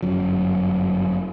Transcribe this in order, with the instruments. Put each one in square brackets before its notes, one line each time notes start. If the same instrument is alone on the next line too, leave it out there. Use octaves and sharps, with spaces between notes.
[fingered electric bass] G1 F#2 F#3